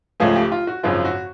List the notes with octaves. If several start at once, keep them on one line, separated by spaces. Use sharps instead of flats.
C#2 C#3 F3 A3 G#4
G4
F4
F#4
G#1 F#2 C#3 F3 F4
F#4